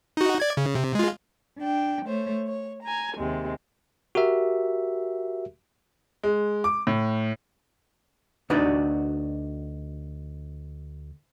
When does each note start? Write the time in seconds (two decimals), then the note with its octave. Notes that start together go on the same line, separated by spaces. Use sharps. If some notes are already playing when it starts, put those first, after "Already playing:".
0.17 D#4 F#4
0.40 D5 G#6
0.57 C#3
0.75 C3
0.95 G#3 F4
1.59 D4 G5
2.05 A3 C5 C#5
2.46 C#5
2.82 G#5 A#5
3.15 D#2 C3 G#3
4.15 F#4 G4 A#4 E5
6.23 G#3
6.64 D6
6.87 A2
8.50 D2 D4 D#4 F#4 B4 D5